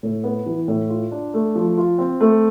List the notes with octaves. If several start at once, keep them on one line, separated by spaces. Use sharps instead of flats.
A2
B3
E3
A2
F4
D4
A3
F3
F4
C4
A3